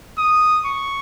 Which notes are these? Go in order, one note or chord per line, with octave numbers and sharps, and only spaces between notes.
D#6
C#6